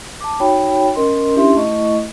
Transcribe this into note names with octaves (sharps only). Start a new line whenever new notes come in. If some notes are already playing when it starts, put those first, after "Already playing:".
A5 D6
D#4 F#4 C#5 G5 B5
C#4 A#4 D#5 C6
C#4 D4 E4 G4 E5 C6
A3 E4 D#5 C#6